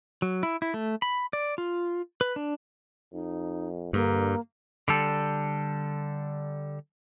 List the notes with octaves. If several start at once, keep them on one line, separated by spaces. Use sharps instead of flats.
F#3
E4
E4
A3
B5
D5
F4
B4
D4
F2 D#4
G2 D3 A#3
D3 G3 A4